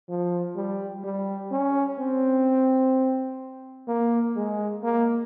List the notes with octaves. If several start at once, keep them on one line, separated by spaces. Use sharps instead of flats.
F3
G3
G3
C#4
C4
A#3
G#3
A#3